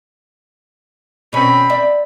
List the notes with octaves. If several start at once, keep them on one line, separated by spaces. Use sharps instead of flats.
B2 C4 C#4 B5
D5 E5